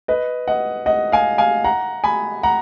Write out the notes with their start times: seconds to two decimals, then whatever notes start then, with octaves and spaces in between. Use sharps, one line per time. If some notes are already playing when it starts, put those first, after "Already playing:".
0.08 B4 D#5
0.48 D#5 F#5
0.86 D#5 F#5
1.12 F5 G#5
1.38 F5 G#5
1.64 F#5 A#5
2.04 G#5 B5
2.43 F#5 A#5